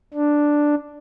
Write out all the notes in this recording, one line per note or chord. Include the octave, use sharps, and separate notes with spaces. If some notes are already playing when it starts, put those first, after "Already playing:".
D4